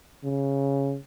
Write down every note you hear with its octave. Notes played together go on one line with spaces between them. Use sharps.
C#3